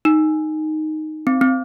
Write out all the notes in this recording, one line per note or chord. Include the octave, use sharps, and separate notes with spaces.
D#4
C4
C4